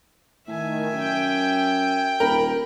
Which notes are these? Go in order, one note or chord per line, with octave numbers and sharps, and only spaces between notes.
A2 D#3 E5 G#5
F#2 G5
D#1 A#4 B5